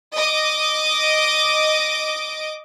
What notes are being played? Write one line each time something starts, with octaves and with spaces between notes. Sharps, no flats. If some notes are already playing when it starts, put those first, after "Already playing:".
D#5 D6